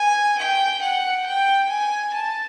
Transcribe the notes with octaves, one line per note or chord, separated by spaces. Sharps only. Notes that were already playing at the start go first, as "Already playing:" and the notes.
Already playing: G#5
G5
F#5
G5
G#5
A5